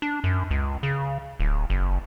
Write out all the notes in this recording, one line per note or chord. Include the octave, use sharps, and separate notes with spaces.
D4
F#2
C#2
C#3
D1
F#1